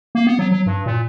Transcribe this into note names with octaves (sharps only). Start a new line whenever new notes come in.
A#3
B3
F#3
F#3
G2
A#2